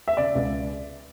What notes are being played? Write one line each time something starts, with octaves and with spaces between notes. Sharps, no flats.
E5
C#3 D5
C#2